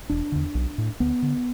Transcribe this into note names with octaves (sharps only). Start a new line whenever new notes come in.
E1 D4
E2 D3
B1
A2
D2 B3
D3